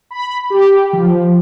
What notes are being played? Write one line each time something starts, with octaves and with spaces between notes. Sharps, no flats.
B5
G4
F3